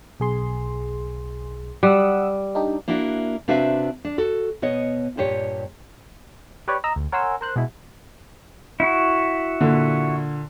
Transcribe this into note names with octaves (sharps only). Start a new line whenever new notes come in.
B1 G#4 C6
G3 F#5 D#6 E6
D4 D#4 G4
A#3 D4 E4 F#4
C3 D4 F#4 B4 E5 F5
D4
F#4 A4
B2 B3 C#5 D#5
G2 A#2 G4 C#5
G4 B4 C#5 D5
D#5 A#5 E6
D2
A#4 C#5 F#5 G#5 C6 E6
A#4 C5 F#6
B2 G#3 E4
E4 F#4
A#2 D3